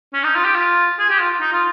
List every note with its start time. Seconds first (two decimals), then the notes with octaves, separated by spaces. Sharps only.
0.13 C#4
0.24 D#4
0.35 F4
0.45 G4
0.55 F4
0.99 G#4
1.10 G4
1.21 F4
1.41 D#4
1.52 F4